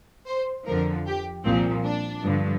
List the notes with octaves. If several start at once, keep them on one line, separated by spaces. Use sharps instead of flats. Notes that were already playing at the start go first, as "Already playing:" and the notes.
C5
F2 D3 F3 A#4
G4
C2 A#2 F3 C4
D4
G2 D3 F3